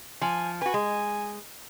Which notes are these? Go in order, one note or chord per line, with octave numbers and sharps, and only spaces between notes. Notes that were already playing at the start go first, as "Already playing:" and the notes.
F3 G#5
F#4 B4 G#5
G#3